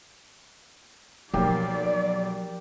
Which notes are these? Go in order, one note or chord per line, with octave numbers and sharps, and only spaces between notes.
B1 F3 A#3 G4 A#4 D5